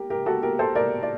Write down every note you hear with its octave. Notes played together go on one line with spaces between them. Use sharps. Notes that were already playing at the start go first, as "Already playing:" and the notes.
Already playing: G4 A#4
G4 A#4
F#4 A4
G4 A#4
A4 C5
A#4 D5
D5